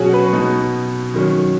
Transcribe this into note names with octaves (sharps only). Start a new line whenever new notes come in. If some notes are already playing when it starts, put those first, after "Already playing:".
Already playing: B2 F#3 C#4 F#4 G#4
B4
B2 B3 D#4
D#3 F#3 C#4